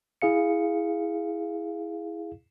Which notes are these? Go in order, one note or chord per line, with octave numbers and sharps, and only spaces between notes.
E4 G#4 F5 C#7